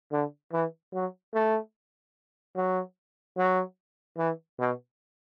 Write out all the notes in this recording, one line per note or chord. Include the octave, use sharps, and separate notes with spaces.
D3
E3
F#3
A3
F#3
F#3
E3
B2